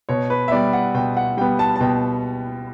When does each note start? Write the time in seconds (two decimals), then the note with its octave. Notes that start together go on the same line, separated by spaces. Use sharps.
0.09 B2 C#5
0.30 B4
0.48 E5
0.52 G3 B3 D5
0.73 F#5
0.94 B2 G5
1.17 F#5
1.37 G3 B3 G5
1.59 A5
1.76 A5
1.80 B2 G5